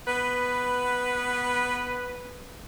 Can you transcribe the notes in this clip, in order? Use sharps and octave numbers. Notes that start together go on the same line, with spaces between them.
B3 B4